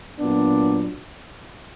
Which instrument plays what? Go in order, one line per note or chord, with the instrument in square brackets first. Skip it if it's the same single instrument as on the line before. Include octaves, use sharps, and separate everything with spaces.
[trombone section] A#2 F#3 B3 D4